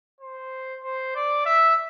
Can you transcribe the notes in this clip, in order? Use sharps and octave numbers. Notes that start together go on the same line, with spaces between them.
C5
C5
D5
E5